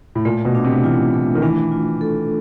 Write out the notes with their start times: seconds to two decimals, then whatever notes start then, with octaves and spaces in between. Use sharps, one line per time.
0.15 A2
0.25 A#2 A3
0.45 B2
0.55 D4
0.65 C3
0.84 E3 F4
1.13 A3
1.35 D#3
1.42 E3 D4
1.72 F4
2.01 A4